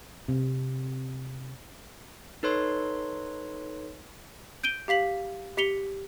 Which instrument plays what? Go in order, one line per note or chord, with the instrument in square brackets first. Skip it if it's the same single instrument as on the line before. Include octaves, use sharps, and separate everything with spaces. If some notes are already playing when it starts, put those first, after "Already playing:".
[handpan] C3
[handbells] D#4 A4 B4 C#5 C6
[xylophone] G6 D7 D#7 G7
G4 F5 B6 F#7
G4 B6 C#7 F7 G7